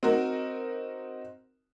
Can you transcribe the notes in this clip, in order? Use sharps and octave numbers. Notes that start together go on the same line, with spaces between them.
C4 D#4 F#4 A#4